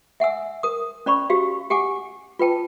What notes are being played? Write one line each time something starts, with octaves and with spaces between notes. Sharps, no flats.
E5 F#5 G#5 E6
A#4 D#6
C#4 D5 B5 C#6
F#4 G4 F5
G4 F#5 G#5 D6
F4 B4 G5 A5